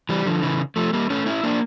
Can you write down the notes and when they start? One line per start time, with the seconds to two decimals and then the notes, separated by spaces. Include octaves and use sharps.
0.09 E3 G3
0.26 D3 F3
0.42 C#3 E3
0.76 F3 A3
0.93 G3 A#3
1.10 A3 C#4
1.26 C#4 E4
1.43 A#3 D4